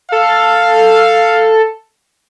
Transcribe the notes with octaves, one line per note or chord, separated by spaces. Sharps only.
A4 F5